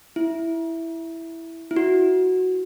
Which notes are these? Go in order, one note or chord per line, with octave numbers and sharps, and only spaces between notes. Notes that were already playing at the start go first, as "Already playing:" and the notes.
E4
E4
F#4